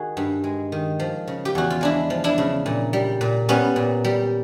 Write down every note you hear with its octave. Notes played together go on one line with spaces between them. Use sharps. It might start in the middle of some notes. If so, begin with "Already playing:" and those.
Already playing: D#3 F#4 G#4
G2
G#3
D#3
F3
C#3
G4
E2 F#4
F4
G#3 D4 E4
F3
D4 E4
C#3
A#2
G3
A#2
G3 B3 C#4
A#2
G3